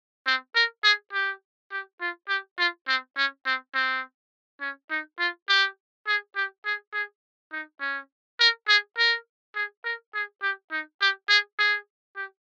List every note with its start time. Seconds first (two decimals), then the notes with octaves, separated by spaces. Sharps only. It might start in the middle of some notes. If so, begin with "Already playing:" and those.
0.26 C4
0.55 A#4
0.83 G#4
1.13 G4
1.72 G4
2.01 F4
2.29 G4
2.58 F4
2.87 C4
3.17 C#4
3.46 C4
3.74 C4
4.61 C#4
4.90 D#4
5.19 F4
5.48 G4
6.07 G#4
6.36 G4
6.65 G#4
6.93 G#4
7.52 D#4
7.80 C#4
8.40 A#4
8.68 G#4
8.98 A#4
9.55 G#4
9.85 A#4
10.14 G#4
10.42 G4
10.71 D#4
11.01 G4
11.29 G#4
11.58 G#4
12.16 G4